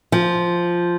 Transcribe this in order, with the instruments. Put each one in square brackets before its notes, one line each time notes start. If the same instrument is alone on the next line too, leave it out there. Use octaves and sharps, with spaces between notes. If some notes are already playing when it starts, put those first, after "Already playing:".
[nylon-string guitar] F3